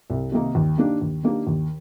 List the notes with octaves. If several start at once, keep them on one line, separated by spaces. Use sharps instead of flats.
C2
C3 D#3 A#3 D#4
D#2
D#3 A#3 D4 G4
D#2
D#3 A#3 D4 G4
D#2